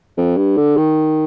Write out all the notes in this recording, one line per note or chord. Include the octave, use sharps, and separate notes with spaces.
F2
G2
D3
D#3